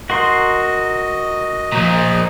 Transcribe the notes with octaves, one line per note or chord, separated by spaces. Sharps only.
F#4 A#4 D#5 C6
A#2 F3